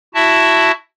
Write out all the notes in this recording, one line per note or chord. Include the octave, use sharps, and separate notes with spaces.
E4 F#4 E5 A5